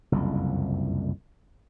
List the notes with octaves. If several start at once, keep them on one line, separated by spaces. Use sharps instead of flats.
F#1 C2 F2